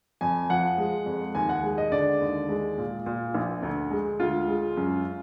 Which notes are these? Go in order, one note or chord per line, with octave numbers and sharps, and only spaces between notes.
F2 G#5
F3 F#5
G#3
F2
D#2 G#5
F#5
G#3
D#5
D3 D5
D#2
G#3
A#2
A#2
A#1
D2
G#3
D2 F4
G#3
F#2